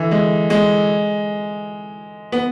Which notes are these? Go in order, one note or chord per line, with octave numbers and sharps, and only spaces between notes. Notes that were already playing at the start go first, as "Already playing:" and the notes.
Already playing: D3 E3
G#3
G#3
B3